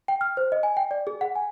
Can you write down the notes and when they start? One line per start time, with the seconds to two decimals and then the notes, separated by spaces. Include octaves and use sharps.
0.08 G5
0.21 F6
0.37 C5
0.52 D#5
0.63 G#5
0.77 G5
0.91 D5
1.07 G#4
1.21 F#5
1.36 G#5